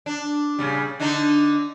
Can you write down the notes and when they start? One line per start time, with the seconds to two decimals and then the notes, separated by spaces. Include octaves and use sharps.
0.06 D4
0.59 A#2 C#3 G3
1.00 D3 D4 D#4